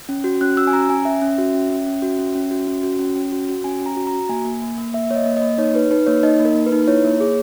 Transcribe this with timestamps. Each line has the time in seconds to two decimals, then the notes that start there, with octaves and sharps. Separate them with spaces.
0.09 C#4
0.24 F#4
0.41 C#4 F#6
0.57 F#4 E6
0.67 G#5
0.73 C#4 A#5
0.89 C#4 G#5
1.05 C#4 E5
1.22 C#4
1.38 F#4
1.54 C#4
1.70 C#4
1.87 C#4
2.02 F#4
2.19 C#4
2.35 C#4
2.51 F#4
2.67 C#4
2.83 F#4
2.99 C#4
3.16 C#4
3.32 F#4
3.49 F#4
3.64 C#4 G#5
3.81 C#4
3.86 A#5
3.96 F#4
4.07 A#5
4.13 F#4
4.29 A#3 G#5
4.45 A#3
4.62 A#3
4.78 A#3
4.93 A#3 E5
5.11 A#3 C#5
5.16 D#5
5.26 A#3
5.37 D#5
5.42 A#3
5.58 D#4 C#5
5.74 D#4 B4
5.91 D#4 B4
6.07 A#3 C#5
6.23 D#4 D#5
6.40 A#3
6.45 A#4
6.55 A#3
6.66 B4
6.72 D#4
6.88 E4 C#5
7.05 A#3
7.20 G#4